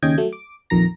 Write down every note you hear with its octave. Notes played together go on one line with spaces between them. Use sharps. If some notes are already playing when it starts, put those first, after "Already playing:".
D#2 C#3 C#4 D#5 G5 G#6
F#3 A3
D6
A#1 F2 D#3 A#5 A#6